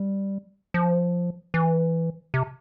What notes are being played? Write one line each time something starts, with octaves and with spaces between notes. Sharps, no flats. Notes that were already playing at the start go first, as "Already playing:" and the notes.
Already playing: G3
F3
E3
C3